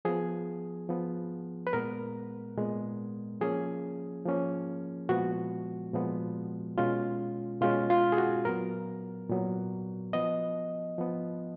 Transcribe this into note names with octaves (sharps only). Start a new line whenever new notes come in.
F3 B3 G#4
F3 B3
B4
A#2 G#3 B3 A#4
A#2 G#3 B3
F3 A#3 C#4 G#4
F3 A#3 C#4
A#2 F3 G#3 B3 F#4
A#2 F3 G#3 B3
B2 G#3 C#4 F4
B2 G#3 C#4 F4
F4
G#4
F#4
A#2 F#3 B3 A#4
A#2 F#3 B3
F3 B3 D#5
F3 B3